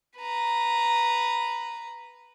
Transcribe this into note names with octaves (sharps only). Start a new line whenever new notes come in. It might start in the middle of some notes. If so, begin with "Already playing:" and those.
B4 A#5